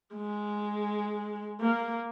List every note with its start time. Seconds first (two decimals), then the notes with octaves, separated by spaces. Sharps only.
0.15 G#3
1.60 A#3